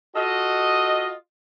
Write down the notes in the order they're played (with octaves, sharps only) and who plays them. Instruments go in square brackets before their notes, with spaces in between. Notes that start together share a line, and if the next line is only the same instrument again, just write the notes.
[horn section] F4 F#4 A4 D#5